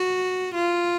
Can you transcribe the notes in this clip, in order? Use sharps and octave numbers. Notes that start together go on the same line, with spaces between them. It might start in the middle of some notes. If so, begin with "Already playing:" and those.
Already playing: F#4
F4